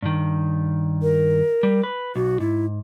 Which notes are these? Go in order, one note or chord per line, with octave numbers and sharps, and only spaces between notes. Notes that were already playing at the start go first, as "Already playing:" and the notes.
G2 D#3
A#4
G3
B4
B1 F#4
G#2 E4